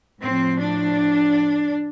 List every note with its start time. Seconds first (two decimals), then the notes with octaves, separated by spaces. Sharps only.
0.22 A2 F3 C4
0.59 D4